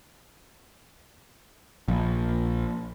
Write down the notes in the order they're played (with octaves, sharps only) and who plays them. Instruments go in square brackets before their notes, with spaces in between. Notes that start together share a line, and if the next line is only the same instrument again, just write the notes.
[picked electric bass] A#1